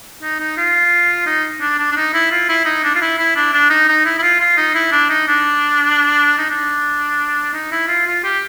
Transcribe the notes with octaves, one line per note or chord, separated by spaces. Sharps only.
D#4
D#4
F4
D#4
D4
D4
D4
D#4
E4
F4
E4
D#4
D4
F4
E4
E4
D4
D4
D#4
D#4
E4
E4
F4
F4
D#4
E4
D4
D#4
D4
D#4
D4
D#4
E4
F4
F4
G4